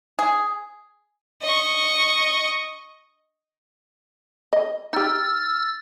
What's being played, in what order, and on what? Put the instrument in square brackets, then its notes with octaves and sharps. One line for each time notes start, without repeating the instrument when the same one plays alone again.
[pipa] G#4
[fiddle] D#5 C#6
[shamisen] D#5
[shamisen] D#4 G4 [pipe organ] E6 F6 A6